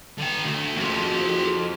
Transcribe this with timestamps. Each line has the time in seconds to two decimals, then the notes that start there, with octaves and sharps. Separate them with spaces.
0.18 D3 G5
0.44 D3 A3
0.77 F2 F#4 G#4